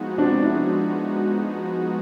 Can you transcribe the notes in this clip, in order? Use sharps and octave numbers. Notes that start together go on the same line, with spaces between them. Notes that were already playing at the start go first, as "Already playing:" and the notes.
Already playing: F3 G#3 B3 D#4 F#4
C4 D4
D4 E4